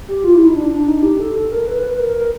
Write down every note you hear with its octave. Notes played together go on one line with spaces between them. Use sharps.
G4
F4
E4
D#4
D4
D4
D#4
G4
A4
A4
A#4
B4
B4
A#4
A#4